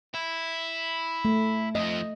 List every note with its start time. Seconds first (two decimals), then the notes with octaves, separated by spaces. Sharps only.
0.14 E4
1.25 A3
1.75 F2 F3 D#5